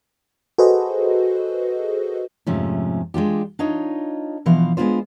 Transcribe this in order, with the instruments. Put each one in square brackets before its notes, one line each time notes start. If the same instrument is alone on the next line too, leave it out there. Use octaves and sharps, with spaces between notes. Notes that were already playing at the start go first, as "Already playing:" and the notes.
[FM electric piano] F#4 G#4 A4 B4 C5 D#5
[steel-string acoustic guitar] F2 G#2 C3 F3 A3 C#4
G#3 D4 F4 G4
D4 D#4 F4 C#5 D#5
B2 E3 F3 C5 F5
G#3 B3 C4 D4 F4 C5